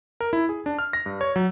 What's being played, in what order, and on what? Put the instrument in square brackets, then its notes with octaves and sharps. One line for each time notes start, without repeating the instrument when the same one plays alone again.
[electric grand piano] A#4
E4
G#4
D4
F6
A#6
G2
C#5
F#3